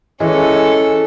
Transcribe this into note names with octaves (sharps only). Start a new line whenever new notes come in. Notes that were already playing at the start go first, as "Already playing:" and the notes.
E3 G#3 C#4 A4